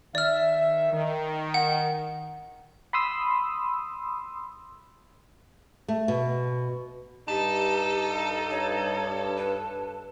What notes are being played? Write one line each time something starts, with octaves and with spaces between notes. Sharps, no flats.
D#3 D5 E5 F6
D#3
F#5
B5 C6 D#6 E6
A3
B2
G2 D#4 G4 A4
C#5
B4